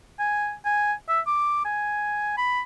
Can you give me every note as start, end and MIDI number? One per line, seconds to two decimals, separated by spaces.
0.19 0.53 80
0.65 0.93 80
1.08 1.20 76
1.27 1.64 86
1.65 2.35 80
2.38 2.61 83